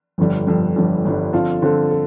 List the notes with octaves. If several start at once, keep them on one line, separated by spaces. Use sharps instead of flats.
G1 F2 D3 G3
G1 F2 D3 G3
G1 F2 D3 G3
G1 F2 D3 G3
D3 F3 C4 F4 A4
D3 F3 C4 F4 A4
A4